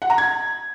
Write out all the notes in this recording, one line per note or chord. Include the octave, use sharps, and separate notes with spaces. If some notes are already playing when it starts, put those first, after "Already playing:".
F#5
A#5
G#6